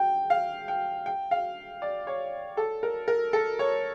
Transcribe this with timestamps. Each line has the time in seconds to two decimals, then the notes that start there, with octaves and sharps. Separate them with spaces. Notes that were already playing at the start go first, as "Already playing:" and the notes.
Already playing: G5
0.30 F5
0.68 G5
1.06 G5
1.31 F5
1.82 D5
2.07 C#5
2.57 A4
2.83 A#4
3.08 A#4
3.33 A4
3.59 C#5